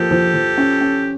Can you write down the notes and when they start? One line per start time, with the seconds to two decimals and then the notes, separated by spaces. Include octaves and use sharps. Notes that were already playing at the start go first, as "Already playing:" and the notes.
Already playing: F3 A#3 G4 A4
0.11 F3
0.34 F3
0.58 C#4
0.81 C#4